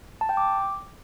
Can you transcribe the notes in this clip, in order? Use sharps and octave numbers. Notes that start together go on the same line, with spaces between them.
A5
G5
D6